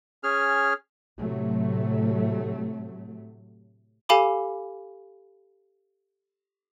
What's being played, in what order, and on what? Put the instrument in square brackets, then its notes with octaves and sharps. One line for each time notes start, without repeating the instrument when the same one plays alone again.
[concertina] C#4 G#4 F6
[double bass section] A2 C3 F#3 A3
[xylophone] G4 A4 F5 G#5 B5 D6